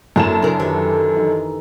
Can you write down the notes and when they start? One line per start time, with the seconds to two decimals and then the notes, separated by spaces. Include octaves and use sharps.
0.16 F#2 D3 A#3 E4 A5 E7
0.42 C#3 C#4 D4 E4 A#4
0.60 D3 D#3 G4 B4
1.17 E3 D#4